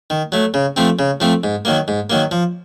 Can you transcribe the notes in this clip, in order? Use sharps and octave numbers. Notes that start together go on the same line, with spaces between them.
D#3
F#3 A3
C#3
F3 A3 C4
C#3
F3 A3 C4
G#2
D#3 F#3 A#3
G#2
D#3 F#3 A#3
F3